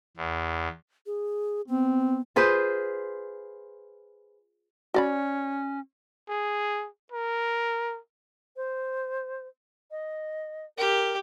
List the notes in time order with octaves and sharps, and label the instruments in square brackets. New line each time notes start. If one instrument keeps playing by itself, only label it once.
[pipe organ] E2
[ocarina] G#4
[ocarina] B3 [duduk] C4
[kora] F4 G#4 B4 C5
[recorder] C#4 [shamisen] F#4 D5 B5
[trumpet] G#4
A#4
[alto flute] C5
D#5
[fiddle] G4 [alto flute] A#4